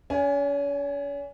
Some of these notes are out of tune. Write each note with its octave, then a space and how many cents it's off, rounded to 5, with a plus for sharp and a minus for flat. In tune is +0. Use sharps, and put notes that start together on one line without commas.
C#4 +40 G#5 -5